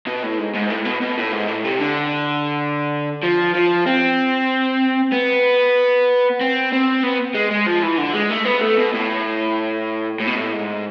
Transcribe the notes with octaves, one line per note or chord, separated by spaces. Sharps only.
B2
A2
G#2
G#2
A2
B2
B2
A2
G#2
A2
C3
D3
F3
F3
C4
B3
C4
C4
B3
G#3
G#3
F3
E3
D3
G#3
A3
B3
A3
B2
A2
A2
B2
A2
G#2